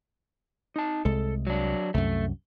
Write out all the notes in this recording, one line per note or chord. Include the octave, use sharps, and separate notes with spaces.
D#4 A5
C2 G#3 A4
F#3 D4
C2 F#2 A3